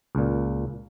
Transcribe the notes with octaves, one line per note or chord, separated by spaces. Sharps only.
C#2 A#2